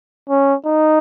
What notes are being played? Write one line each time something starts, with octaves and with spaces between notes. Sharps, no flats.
C#4
D#4